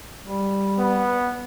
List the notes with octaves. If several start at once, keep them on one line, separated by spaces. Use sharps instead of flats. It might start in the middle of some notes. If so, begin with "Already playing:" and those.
G3
B3